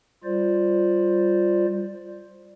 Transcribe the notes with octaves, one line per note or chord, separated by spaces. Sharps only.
G3 F4 C5 D5